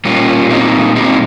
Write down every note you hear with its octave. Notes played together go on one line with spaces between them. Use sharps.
A#2 G3 A#3 C#4 F4
C4 D#4
C4 D#4